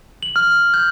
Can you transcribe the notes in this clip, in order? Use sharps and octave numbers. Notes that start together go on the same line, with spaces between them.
F#7
F6
G6